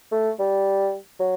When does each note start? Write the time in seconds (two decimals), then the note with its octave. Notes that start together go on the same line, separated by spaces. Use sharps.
0.11 A3
0.39 G3
1.19 F#3